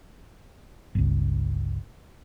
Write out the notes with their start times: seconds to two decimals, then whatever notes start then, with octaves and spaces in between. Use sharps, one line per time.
0.95 G1 C#2